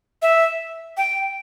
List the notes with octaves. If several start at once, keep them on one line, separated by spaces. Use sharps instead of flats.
E5
G5